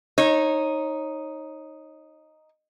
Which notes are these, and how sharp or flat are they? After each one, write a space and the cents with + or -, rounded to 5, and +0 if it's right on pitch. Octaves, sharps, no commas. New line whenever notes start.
D#4 +0 C#5 -25